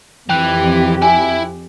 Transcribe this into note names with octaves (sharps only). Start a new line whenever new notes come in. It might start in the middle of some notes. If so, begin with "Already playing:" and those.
F2 E3 G4 G5 F#6
E4 E5 G#5